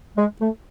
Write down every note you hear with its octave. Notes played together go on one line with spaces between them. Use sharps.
G#3
A3